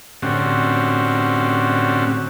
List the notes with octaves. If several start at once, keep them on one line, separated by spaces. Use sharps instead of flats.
A2 D3 C4 C#4 F#4 G4